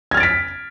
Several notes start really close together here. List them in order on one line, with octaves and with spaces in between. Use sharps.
G#6 F6 A6 D7 B6